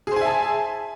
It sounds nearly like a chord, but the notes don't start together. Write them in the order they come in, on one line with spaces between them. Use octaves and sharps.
G#4 C5 G#5 E5 A5